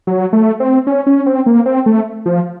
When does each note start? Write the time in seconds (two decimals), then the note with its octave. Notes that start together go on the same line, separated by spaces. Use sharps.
0.07 F#3
0.33 A3
0.60 C4
0.87 C#4
1.07 C#4
1.26 C4
1.46 A#3
1.66 C4
1.86 A3
2.26 F3